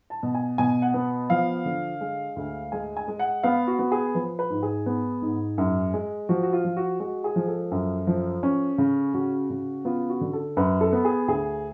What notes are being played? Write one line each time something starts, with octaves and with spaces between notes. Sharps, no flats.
A5
B2
G#5
B2 G#5
F#5
B3
F3 F5
D3
G#3
D2
G#3 G#5
G#5
G#3
F#5
B3 F5
F#4
B3
G#4
F3 B4
B4
G#2
G#4
B3
G#2
F#2
G#3
F3 F#4
F#4
F4
F3
F#4
G#3 F#4
G#4
F3
A4
F#2
F3
C#4
C#3
C#3 F#4
C#3
B3 F4
F#4
D3
A4
F#2 B4
A4
B3
G#4
D2 G#4